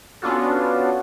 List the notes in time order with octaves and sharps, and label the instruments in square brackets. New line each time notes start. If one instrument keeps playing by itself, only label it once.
[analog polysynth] B3 C#4 D4 F4 F#4 A4